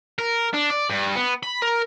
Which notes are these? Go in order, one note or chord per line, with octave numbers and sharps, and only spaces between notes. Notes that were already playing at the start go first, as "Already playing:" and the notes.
A#4
D4
D5
G2
B3
B5
A#4